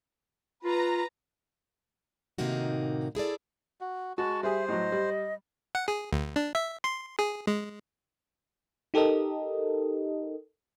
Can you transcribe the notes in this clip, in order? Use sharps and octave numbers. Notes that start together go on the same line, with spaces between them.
F4 B4 A#5
A2 C3 D#3 A#3 D#4 F#4
E4 G#4 A4 D5
F#4
G#3 F#4 A5 C#6
G3 G#4 C5 E5
A2 F#3 D#5
G3
F#5
G#4
D2
D4
E5
C6
G#4
G#3
D#4 G4 A4 A#4 D#5